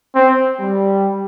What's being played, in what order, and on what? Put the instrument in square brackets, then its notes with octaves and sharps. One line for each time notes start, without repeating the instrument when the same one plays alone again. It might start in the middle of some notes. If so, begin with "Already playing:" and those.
[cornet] C4
[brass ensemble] G3